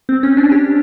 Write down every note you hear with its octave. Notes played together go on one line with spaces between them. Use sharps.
C4
C#4
D4
G4